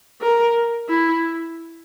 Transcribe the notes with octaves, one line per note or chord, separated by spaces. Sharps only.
A#4
E4